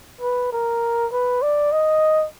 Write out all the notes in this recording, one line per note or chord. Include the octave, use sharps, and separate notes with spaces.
B4
A#4
B4
D5
D#5